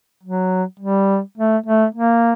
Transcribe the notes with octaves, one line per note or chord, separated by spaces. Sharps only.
F#3
G3
A3
A3
A#3